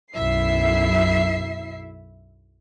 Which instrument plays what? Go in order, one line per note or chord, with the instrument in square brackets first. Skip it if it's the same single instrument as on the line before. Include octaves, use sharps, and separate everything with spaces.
[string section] B1 F#2 E4 E5 C7